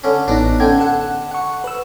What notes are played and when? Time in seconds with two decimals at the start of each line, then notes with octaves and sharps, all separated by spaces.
0.04 D3 C#4
0.28 A1 B3 D4 D#4
0.60 D3 C#4 G5 G#6
0.80 A4 F#5
1.31 F#5 C#6
1.64 B4 E6